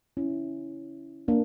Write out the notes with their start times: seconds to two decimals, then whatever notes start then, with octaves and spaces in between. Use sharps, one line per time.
0.17 C#4 E4
1.28 A#3 D4